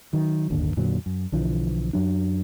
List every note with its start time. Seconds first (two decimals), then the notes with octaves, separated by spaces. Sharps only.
0.13 D#3 F#3
0.50 D1 G1 D#2 D3
0.77 F2 A#2 D3 F#3
1.06 F#2
1.32 B1 D3 E3 F3
1.93 F#2 F#3 D4